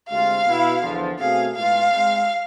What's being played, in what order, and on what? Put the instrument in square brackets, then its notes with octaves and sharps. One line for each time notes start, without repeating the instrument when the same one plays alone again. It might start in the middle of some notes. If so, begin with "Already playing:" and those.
[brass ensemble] D2 C3 G#3 C4 F4 [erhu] F5
[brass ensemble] B2 B3 E4
E2 D3 F3
[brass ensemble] B2 A3 C4 G#4 [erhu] F5
[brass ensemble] A2 G#3 B3 F4 [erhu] F5
[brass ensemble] G#2 G#3 C4